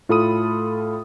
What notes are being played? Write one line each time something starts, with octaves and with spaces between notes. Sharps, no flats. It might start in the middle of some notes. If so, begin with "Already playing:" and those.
A2 F4 A4 B5 D#6 D#7